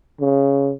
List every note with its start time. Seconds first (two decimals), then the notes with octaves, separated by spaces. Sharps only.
0.20 C#3